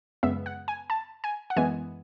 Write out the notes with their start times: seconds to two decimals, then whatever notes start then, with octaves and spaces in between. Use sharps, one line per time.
0.23 F#2 C#3 G#3 B3 E5
0.46 F#5
0.68 G#5
0.90 A5
1.24 G#5
1.50 F#5
1.56 F#2 E3 G#3 B3 G#5